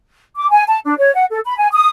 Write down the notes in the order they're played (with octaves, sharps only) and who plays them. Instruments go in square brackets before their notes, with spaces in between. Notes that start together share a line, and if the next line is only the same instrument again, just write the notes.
[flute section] D6
G#5
A5
D4
C#5
F#5
A4
B5
G#5
D#6